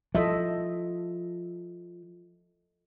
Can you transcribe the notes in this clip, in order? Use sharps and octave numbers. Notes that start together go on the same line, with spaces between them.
F3 A4 D#5 E5